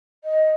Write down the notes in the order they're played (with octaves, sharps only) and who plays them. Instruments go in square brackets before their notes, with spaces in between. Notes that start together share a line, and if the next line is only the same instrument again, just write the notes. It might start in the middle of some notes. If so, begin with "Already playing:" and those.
[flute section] D#5